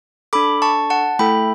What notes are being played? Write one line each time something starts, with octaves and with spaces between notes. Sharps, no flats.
D4 A4 B5 D6
A5 C#6
F#5 A5
A3 E4 A4 G5 B5